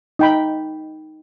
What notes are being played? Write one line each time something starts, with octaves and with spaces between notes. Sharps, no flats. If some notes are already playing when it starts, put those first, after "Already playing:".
D#4 G5 B5